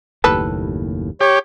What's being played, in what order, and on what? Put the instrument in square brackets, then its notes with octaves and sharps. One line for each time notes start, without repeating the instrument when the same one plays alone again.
[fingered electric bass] F#1 D#2 A2 [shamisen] G3 A4 B4
[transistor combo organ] G4 [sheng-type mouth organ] C#5